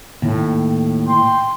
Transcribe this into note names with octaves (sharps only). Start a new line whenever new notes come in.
D#2 A2
G5 C6